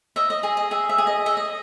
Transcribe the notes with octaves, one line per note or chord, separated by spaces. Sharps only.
D#5 E5
D#5
G#4 D#5
D#5
G#4 E5
E5
G#4
D#5
D#5 E5
D#5